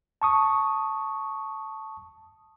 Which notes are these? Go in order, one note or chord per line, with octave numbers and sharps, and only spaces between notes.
A5 C#6 D#6